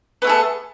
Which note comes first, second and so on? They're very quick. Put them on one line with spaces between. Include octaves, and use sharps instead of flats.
B3 A3 G#4 A4